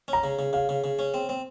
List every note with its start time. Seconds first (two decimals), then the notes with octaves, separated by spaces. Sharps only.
0.08 C#4 A#5
0.24 C#3
0.39 C#3
0.53 C#3 F5
0.69 C#3
0.84 C#3
0.99 C#4
1.14 C4
1.29 C4